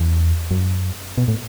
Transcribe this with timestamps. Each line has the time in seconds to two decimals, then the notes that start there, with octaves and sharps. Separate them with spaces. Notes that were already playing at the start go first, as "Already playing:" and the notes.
Already playing: E2
0.51 F#2
1.18 B2
1.28 A2